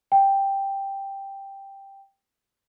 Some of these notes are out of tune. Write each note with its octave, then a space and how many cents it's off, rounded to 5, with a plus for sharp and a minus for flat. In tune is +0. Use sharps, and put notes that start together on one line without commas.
G5 +5